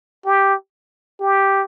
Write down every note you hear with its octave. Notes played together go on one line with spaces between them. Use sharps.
G4
G4